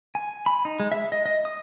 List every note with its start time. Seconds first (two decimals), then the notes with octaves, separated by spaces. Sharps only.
0.15 G#5
0.46 B5
0.65 D#4
0.80 G#3
0.92 E5
1.12 D#5
1.26 D#5
1.45 D#6